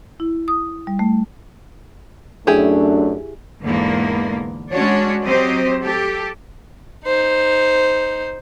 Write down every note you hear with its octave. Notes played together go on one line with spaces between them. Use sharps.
E4
D#6
G3
A3
F#2 A3 D4 E4 G4 G#4
E2 G#2 D3 A#3 B3
G#3 C#4 D4 F#4 C#5 D5
F#3 C4 G4 C5 D#5
G4 A4
D#4 C5